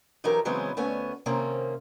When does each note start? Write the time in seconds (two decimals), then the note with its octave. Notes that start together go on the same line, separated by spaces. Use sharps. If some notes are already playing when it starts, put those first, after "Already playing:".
0.24 E3 F#3 D#4 G4 A4 A#4
0.45 C#3 E3 F#3 G#3 B3 C4
0.77 D2 A3 B3 C#4 G#5
1.26 C3 D#3 A#3 C4 C#4